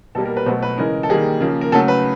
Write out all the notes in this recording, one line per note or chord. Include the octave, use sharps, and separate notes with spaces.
B2 G3 A#3 A4
A#4
B4
B2 F#3 A3 C5
B4
C#3 E3 G#3 A#4
A4
D#3 G3 A#3 G#4
C#3 F3 A#3
A#4
C#3 F#3 A3 A4
B4